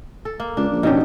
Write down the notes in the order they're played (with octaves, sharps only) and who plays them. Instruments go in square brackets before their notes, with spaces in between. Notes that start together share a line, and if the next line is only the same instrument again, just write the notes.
[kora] A4
A#3
[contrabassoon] C#2 [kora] D4
[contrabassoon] A#1
[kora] B2 F#3 G4 [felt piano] C#4 D#4